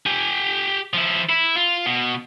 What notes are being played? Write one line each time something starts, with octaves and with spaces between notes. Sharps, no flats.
G4 G#5
F3 E4
E4
F4
B2